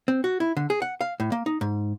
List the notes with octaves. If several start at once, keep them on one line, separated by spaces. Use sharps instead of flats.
C4
F#4
E4
D3
G#4
F#5
F5
A2
A#3
D#4
G#2